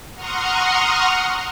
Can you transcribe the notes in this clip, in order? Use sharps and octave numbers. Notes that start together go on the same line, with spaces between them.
F#5 A#5 C6 C#6 D#6 F6